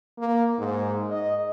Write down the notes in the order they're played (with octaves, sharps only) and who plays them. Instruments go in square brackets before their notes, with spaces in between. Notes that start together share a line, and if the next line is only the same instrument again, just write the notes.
[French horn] A#3
G#2
D#5